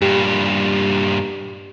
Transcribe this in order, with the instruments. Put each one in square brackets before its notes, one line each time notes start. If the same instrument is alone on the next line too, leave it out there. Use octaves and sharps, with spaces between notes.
[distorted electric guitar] G2 A#2 [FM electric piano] G4